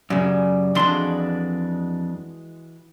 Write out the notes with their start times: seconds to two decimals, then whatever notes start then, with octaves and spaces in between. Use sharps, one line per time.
0.10 F#2 C#3 G3
0.75 F2 E3 G#3 D4 F#4 C6